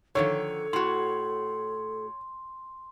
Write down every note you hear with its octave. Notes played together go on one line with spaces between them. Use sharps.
D3 D#3 F3 A4 C#5
A2 F#4 C6